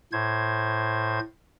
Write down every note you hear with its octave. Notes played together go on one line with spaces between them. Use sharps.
A2 C5 G#6